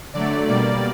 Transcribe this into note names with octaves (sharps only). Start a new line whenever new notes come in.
D3 F#3 A3 D5
B2 G3 A#3 D5